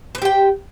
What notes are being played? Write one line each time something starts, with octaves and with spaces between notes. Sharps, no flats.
G4 B4 C5 G5